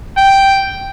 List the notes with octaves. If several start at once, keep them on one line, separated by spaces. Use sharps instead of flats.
G5